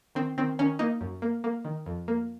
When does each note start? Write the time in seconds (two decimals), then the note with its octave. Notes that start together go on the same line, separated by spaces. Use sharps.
0.15 D#3 C4
0.38 D#3 C4
0.59 D#3 C#4
0.79 A#3 D#4
1.01 F#2
1.22 A#3
1.44 A#3
1.65 D#3
1.86 F2
2.08 A#3